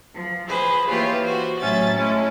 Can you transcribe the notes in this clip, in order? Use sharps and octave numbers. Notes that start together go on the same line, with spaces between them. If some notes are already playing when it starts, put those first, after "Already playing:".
F3
F3 G#4 B4 C5
E3 A#3 F4 G4 C#5
F#4 C5
A2 F#3 C#4 E5 A6
G#3 A3 C#4 E4